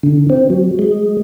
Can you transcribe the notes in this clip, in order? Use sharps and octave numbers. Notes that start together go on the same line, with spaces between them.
D3
C4
F#3
G#3